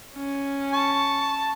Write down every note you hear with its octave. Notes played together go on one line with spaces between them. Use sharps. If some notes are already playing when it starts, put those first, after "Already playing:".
C#4
A5 C#6